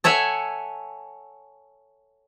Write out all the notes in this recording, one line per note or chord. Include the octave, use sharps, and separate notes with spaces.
A4 C#5 E5 F#5 G#5